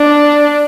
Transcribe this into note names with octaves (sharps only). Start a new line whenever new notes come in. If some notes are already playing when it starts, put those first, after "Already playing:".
Already playing: D4